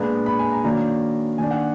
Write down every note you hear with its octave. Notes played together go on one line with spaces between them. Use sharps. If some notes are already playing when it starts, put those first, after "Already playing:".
Already playing: A#2 G#3 B3 D4 A#5
B5
G#5
A#5
D#3 F#3 A#3 D4 A#5
D#3 A#3 D4 G#5
F#5